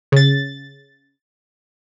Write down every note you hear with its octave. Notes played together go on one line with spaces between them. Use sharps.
C#3 A6